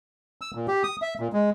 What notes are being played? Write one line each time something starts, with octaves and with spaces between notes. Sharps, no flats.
E6
A#2
G4
D#6
E5
A#2
G#3